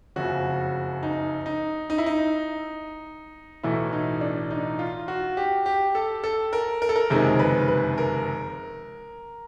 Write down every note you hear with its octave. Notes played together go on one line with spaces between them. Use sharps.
F#1 F2 C#3 F#4
D#4
D#4
D#4
E4
D#4
B1 A2 E3 A3 E4
D#4
D4
D#4
F4
F#4
G4
G4
A4
A4
A#4
A#4
A4
A#4
F#1 F2 C3 D#3 G#3 A#4
B4
B4
A#4